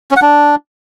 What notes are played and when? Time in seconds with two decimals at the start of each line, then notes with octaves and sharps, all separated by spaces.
0.11 C#4
0.16 F#5
0.22 D4